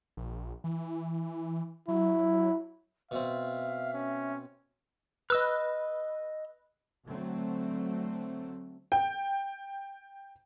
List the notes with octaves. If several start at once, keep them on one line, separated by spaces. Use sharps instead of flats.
A#1
E3
F#3 E4
B2 C4 E5 F5
C#4
B4 D#5 E6 F6
D3 F#3 A3 C4
G5